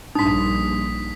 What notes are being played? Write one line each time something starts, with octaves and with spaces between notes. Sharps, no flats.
A#1 G2 D4 D#4 C6 D#6 B6